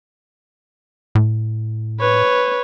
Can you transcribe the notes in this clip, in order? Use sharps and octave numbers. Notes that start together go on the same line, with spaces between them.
A2
B4 C#5